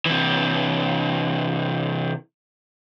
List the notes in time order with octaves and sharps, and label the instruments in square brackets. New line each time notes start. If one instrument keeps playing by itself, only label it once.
[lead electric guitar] C3 E3